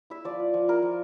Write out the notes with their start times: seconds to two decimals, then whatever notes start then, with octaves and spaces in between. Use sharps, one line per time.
0.10 E4 E5
0.25 F3 D5
0.39 F4
0.54 F3
0.68 E4 A#4
0.83 F3